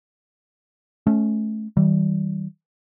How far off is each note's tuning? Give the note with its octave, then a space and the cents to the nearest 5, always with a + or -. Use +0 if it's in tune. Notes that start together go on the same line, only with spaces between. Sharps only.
A3 -25 C#4 +0
D#3 +35 G3 -30